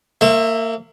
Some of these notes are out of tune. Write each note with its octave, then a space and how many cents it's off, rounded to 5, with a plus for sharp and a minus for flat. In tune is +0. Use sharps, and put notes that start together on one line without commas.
A#3 -30 C5 +45 E5 +0